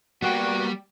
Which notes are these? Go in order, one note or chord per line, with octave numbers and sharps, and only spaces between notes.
G3 A#3 B3 F#4 G5